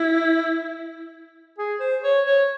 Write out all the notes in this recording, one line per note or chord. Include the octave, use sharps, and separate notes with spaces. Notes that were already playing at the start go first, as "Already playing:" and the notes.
Already playing: E4
G#4
C5
C#5
C#5